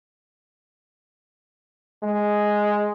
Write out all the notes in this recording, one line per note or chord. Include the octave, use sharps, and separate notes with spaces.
G#3